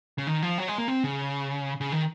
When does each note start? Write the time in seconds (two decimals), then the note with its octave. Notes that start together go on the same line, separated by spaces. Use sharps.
0.18 C#3
0.27 D#3
0.42 F3
0.58 F#3
0.68 G#3
0.78 A#3
0.88 C4
1.04 C#3
1.81 C#3
1.92 D#3